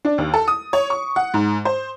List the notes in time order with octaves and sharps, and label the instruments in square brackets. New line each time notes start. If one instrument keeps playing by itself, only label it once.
[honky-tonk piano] D4
D#2
A4
D#6
C#5
C#6
F#5
G#2
C5